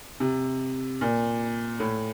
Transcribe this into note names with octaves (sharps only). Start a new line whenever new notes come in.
C3
A#2
A2